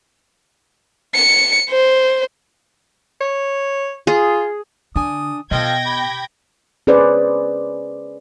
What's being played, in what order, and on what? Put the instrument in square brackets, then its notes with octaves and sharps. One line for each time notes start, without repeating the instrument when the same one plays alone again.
[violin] C#7
C5
[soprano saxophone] C#5
[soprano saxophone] F4 [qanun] G#4
[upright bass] D3 [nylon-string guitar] D4 G#5 [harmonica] D#6
[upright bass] B2 [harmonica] F3 F4 A4 [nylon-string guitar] D#5 [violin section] G5 G#6 A#6
[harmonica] G4 B5
[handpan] C#4 G#4 B4 C5 D5